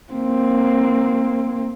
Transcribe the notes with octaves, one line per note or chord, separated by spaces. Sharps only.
A#3 C4